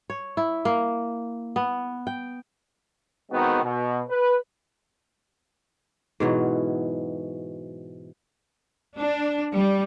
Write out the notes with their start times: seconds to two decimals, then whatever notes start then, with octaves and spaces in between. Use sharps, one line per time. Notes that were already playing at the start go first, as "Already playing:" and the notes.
0.10 C#5
0.37 E4
0.65 A#3
1.56 B3
2.07 G5
3.31 D#3 G#3 B3 C4 D#4 F#4
3.63 B2
4.09 B4
6.20 G#2 B2 E3 F#3
8.99 D4
9.54 G3